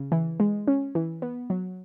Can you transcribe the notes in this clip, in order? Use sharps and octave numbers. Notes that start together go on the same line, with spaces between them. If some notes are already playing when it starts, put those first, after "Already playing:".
Already playing: C#3
E3
G#3
C#4
E3
B3
F#3